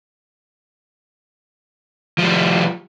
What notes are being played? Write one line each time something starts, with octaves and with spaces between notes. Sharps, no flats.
F3 G3